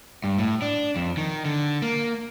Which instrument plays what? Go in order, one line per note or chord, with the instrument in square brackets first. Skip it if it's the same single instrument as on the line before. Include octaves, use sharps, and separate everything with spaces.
[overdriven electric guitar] G2
A2
D4
F2
D#3
D3
A#3